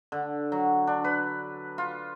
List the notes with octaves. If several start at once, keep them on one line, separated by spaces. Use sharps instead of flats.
D3
F#3
D4
B4
F4